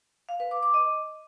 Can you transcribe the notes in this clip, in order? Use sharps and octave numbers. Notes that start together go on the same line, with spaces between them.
F5
B4
D6
D6
D#5